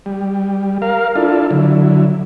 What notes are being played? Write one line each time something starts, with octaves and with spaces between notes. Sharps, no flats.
G3
A#4 F5
D4 E4 F4 A4
D3 F#3 E4